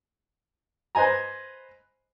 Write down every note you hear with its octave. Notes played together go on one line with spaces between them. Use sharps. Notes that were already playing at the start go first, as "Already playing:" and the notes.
B4 C5 D#5 G#5 A#5